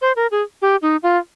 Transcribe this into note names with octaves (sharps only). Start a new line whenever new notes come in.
C5
A#4
G#4
G4
D#4
F4